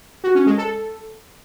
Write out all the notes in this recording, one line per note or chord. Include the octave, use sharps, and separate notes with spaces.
F#4
C#4
G#3
A4